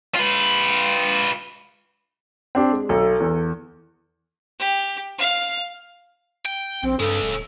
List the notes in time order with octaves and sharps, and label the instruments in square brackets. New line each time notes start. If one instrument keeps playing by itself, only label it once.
[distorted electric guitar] F4 B4
[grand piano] C4 D4 G4
G#3
[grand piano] B1 [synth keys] A4
[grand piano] E2
[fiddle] G4
F5
[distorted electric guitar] G5
[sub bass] A#1 [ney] C4
[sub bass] G2 [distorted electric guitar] C#3 G#3 [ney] A4
[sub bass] D1